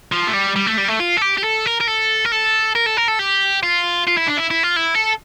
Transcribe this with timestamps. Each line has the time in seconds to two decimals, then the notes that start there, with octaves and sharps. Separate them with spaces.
0.12 F3
0.27 A3
0.33 G3
0.56 G3
0.66 A3
0.78 G3
0.88 A3
0.99 F4
1.17 A4
1.21 G4
1.37 G4
1.43 A4
1.65 A#4
1.80 A#4
1.87 A4
2.25 A#4
2.32 A4
2.75 A#4
2.86 A4
2.97 A#4
3.08 A4
3.19 G4
3.63 F4
4.07 F4
4.17 E4
4.27 D4
4.37 E4
4.51 E4
4.63 F4
4.76 E4
4.95 A4